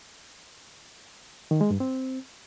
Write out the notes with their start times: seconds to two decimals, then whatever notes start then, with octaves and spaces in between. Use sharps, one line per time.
1.51 D#3
1.61 G#3
1.71 G2
1.80 C4